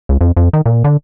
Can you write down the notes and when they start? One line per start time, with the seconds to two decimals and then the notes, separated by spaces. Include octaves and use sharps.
0.09 C#2
0.21 F2
0.37 F2
0.53 D#3
0.66 A#2
0.84 D3